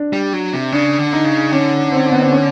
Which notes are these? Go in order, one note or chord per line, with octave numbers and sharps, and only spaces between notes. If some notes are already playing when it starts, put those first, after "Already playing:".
Already playing: D4
G3
F#3
C3
C#3 D4
D3
D#4
C#3
D3 C#4
C4
B3
C4
C#4